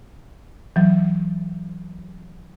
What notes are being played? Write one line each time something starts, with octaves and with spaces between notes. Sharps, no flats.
E3 F#3